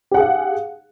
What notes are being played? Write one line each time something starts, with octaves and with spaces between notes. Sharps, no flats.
G4 G#4 F5 F#5